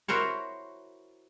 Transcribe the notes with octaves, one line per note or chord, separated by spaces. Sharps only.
E4 F#4 A#4 C5 C#5